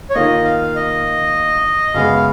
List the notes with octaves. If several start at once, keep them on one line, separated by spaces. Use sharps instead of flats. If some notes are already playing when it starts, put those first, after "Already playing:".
C#5
D#3 A#3 F4 D#5
F5
D#5
F#2 C#3 G#3 B3 F5